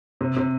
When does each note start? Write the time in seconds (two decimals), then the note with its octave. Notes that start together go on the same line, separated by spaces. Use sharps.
0.21 C3
0.36 C3